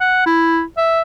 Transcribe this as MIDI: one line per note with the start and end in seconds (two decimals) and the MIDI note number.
0.01 0.24 78
0.26 0.63 64
0.78 1.02 76